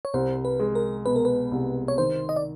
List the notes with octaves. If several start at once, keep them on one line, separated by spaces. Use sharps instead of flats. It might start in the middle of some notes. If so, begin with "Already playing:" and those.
C#5
C2 C5
B4
G#3
A#4
B2 B4
A#4
B4
C2
C#5
D#3 C5
D#5
D5